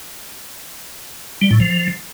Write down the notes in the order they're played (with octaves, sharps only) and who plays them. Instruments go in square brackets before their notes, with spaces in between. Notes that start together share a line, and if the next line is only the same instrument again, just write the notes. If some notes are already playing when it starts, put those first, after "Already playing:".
[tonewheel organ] G3
A2
F3